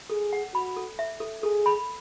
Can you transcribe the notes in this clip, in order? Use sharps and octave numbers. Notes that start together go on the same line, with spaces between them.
G#4 A4
F#5
F#4 B5
A4
E5
A4
G#4 A4
B5